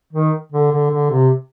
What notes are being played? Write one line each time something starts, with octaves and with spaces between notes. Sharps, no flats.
D#3
D3
D3
D3
C3